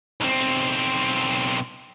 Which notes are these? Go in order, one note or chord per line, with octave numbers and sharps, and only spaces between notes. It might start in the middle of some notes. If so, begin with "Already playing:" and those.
B1 C4